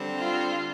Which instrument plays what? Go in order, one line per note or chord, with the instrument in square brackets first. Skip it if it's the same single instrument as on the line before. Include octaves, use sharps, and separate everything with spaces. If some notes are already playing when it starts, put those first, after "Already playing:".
Already playing: [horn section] D3 G3 C4
[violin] F4